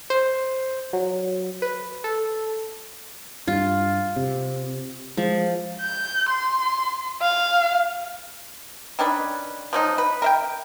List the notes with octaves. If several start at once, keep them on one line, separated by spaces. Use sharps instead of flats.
C5
F#3
B4
A4
G2 F4
C3
F3 G#3
G6
C6
F5
D#3 C#4 D4 B4
F3 F#3 D#4
B4
A#4 E5 G5